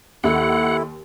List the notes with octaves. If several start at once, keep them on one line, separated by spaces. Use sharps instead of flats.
D#2 E4 A4 F#5